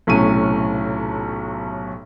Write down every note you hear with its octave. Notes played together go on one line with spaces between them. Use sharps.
B1 A2 C3 C#4 D#7